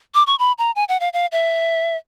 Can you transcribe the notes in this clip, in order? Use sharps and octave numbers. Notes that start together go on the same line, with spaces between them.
D6
C#6
B5
A#5
G#5
F#5
F5
F5
E5